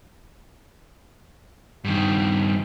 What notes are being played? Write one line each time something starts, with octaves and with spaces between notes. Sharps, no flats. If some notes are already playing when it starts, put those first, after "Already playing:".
G2 D#3